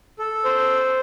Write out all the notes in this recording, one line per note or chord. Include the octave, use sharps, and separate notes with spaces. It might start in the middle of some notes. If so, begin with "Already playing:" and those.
A4
C5